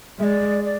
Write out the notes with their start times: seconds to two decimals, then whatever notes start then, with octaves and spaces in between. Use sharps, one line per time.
0.19 G#3 E5
0.24 D5
0.64 D5